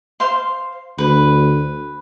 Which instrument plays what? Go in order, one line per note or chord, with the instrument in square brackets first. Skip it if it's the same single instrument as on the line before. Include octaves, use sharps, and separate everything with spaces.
[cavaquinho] C5 F5 C6
[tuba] D2 [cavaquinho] B4